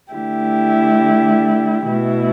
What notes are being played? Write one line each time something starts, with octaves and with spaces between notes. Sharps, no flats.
D3 A3 E4 G4
B2 A3 E4